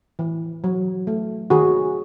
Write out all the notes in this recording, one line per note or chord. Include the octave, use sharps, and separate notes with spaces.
E3
F#3
A3
D#3 F#4 G#4